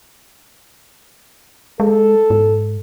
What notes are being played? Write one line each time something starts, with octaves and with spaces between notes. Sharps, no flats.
G#3 A4
G#2